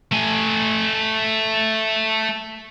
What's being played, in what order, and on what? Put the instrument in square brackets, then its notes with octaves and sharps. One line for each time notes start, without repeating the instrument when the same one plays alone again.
[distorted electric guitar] A3 G#5